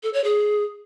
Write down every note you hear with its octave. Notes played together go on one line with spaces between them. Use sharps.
A4
C#5
G#4